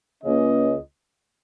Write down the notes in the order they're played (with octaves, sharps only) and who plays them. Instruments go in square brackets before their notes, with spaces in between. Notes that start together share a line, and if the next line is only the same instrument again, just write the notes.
[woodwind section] C#2 C#3 A#3 C#4 [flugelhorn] D#5